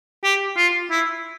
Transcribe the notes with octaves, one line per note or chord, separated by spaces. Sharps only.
G4
F4
E4